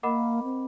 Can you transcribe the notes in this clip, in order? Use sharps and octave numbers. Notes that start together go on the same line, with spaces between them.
A#3 A#4 D#5 F#5 B5 D6
C4